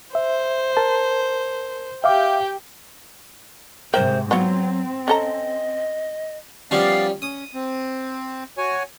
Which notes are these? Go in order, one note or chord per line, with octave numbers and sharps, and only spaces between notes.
C5 E5
A#4 A5
G4 E5 F5 G5 D6
G#2 C3 A#4 C5 E5 G5
F#3 B3 C4 F4 F#4
C#4 A4 D#5 A#5
F3 G3 B3 C#4 D5 F5
C#4 D#6
C4
F#4 C#5 G#5